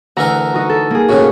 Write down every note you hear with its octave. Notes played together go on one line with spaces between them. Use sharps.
D2 E3 A#4 F#5 A#5
D#4 F#4
A4
A#3 G#4
A2 C#3 F#4